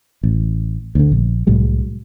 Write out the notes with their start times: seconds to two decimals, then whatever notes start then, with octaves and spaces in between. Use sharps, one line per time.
0.23 A1
0.95 D2 D3
1.12 A#1
1.47 C2 A2 F#3 G#3